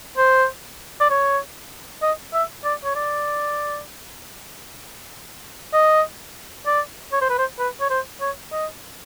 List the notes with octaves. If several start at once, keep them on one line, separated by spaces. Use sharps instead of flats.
C5
D5
C#5
D#5
E5
D5
C#5
D5
D#5
D5
C#5
C5
B4
C5
B4
C#5
C5
C#5
D#5